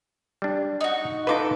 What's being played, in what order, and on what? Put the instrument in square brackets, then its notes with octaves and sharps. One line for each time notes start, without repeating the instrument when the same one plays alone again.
[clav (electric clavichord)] G3 D4
[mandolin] D#4 F#4
[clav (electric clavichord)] D#4 F4 B4 [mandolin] A4 D6